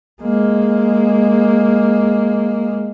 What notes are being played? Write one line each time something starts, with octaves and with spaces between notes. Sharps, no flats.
G#3 A#3